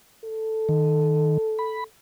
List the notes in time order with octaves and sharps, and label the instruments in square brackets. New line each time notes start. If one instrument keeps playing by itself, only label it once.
[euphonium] A4
[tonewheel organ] D#3
B5